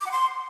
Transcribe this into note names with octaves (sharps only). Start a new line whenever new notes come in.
D6
F#5
C6